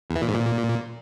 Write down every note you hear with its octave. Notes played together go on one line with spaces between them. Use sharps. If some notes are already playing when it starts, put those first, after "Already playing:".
E2
E3
A#2
G#2
A#2